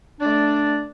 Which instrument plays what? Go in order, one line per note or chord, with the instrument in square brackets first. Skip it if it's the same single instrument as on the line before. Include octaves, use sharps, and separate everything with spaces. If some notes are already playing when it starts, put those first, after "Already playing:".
[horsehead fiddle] A3 D5 [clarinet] D4